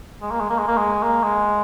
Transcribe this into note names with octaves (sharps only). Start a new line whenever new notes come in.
G#3
A#3
G#3
A#3
G#3
A#3
G#3
A#3
G#3